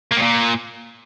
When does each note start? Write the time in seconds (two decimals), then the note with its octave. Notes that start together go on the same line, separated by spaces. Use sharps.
0.11 A#3
0.16 A2
0.22 A#2